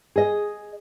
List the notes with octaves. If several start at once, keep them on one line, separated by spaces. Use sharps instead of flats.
G#4 D#5